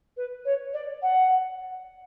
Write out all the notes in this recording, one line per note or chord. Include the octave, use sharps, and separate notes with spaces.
B4
C#5
D5
F#5